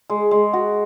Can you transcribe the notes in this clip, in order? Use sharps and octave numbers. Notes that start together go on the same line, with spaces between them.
G#3
G#3
F#4